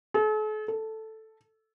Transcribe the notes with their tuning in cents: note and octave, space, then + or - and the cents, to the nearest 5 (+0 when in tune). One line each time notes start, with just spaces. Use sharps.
A4 -45
A4 +0